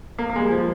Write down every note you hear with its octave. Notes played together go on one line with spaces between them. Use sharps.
A#3
A#3
G#3
G3
F3